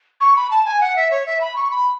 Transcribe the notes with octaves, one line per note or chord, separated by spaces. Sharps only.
C#6
B5
A5
G#5
F#5
E5
C#5
E5
B5
C#6
B5